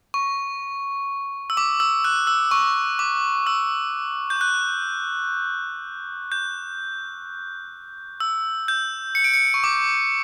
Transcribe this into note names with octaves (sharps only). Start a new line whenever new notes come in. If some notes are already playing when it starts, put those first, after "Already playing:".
C#6
E6
D6
E6
F#6
E6
C#6
D6
E6
G6
F#6
G6
E6
G6
C#7
D7
C#7
C#6
D6